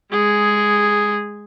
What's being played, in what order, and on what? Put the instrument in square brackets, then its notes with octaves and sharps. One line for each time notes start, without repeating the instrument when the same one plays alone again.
[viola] G#3 G#4